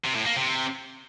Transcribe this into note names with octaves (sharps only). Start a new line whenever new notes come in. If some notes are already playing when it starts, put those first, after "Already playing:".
C3
A2
A#3
C3